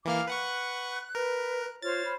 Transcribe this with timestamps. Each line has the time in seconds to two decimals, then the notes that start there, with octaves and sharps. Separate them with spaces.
0.05 E3 A#3 F5 D6 F6
0.27 B4 F#5 C#6 F#6
1.15 A#4 B4
1.82 F4 C5 C#5 F6 A6
2.05 B5